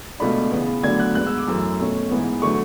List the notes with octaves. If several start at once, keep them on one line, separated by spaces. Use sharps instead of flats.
C#2 B2 A3 D4 B5
C#3 E3 B3
D2 D3 F#3 B3 D4 G#6
F#6
G#2 G#3 B3 F#6
E6
D6
F#2 E3 A3 E6
B2 A3 C#4
G#2 E3 B3
D3 F#3 A3 C#6